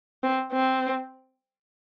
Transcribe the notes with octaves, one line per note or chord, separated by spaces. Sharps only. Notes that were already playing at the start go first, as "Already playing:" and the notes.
C4
C4